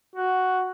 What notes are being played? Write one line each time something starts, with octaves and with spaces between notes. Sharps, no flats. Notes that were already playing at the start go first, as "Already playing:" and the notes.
F#4